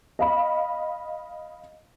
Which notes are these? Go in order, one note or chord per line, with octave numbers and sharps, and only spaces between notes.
D#5 F5 B5